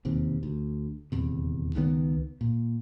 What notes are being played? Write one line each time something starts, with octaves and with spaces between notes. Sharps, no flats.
E1 D#2 C3
D2
D#1 E2 C3
C#2 D#3 F#3 B3
A#2